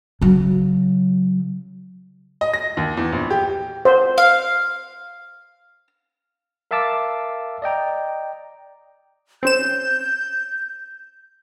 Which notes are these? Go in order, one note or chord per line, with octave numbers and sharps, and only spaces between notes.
C#3 F#3
D#5
A#6
D#2
E2
A#1
G4
C5
F5
A#4 E5 F5 A5 D6 E6
D5 D#5 G5 A#5
C4 C#4 G6 E7